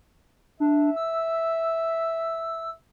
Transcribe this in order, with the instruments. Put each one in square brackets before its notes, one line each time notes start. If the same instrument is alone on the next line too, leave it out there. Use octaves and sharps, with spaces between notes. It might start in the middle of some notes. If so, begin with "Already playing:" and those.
[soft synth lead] D4 [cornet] E5
[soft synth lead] E6